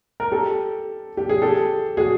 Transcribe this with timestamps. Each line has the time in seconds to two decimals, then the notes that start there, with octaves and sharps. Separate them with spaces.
0.20 A#4
0.32 G4 A4
1.17 G4
1.29 G#4
1.42 G4 A4
1.97 F#4 G#4